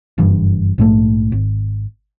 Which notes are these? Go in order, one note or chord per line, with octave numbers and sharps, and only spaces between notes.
F#1 G2 E3
A#1 G#2 A3
G#1